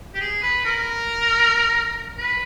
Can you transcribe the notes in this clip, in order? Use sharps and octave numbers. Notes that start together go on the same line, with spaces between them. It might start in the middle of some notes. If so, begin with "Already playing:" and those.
G4
G#4
B4
A#4
B4